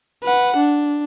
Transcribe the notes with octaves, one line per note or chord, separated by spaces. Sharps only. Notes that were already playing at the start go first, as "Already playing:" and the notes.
B4 F#5
D4